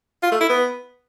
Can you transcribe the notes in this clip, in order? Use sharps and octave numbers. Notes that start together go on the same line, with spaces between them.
F4
A3
E4
B3